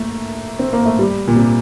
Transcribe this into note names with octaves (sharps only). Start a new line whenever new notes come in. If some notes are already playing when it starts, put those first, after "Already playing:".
Already playing: A3 A#3
C4
A#3
A3
G3
A#2
C3